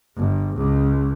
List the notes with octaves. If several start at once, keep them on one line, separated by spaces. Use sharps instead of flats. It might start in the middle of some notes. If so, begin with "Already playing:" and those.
G1
C#2